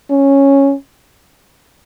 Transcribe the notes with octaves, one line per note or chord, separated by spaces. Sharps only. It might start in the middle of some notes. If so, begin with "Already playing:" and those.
C#4